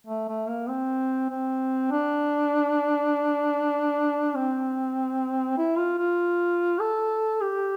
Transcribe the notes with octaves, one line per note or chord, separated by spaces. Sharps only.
A3
A3
A#3
C4
C4
D4
C4
E4
F4
F4
A4
G4